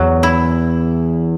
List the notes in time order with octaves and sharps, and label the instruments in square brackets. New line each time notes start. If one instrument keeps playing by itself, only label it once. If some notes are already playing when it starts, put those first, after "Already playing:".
Already playing: [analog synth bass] E2 [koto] F#3
[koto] E4